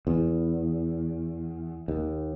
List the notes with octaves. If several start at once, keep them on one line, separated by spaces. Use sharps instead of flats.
E2
D#2